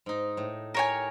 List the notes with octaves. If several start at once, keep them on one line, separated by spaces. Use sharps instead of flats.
G#2 D#4
A2
G4 A#4 C#5 G#5